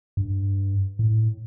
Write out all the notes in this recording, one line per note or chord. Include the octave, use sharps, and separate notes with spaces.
G2
A2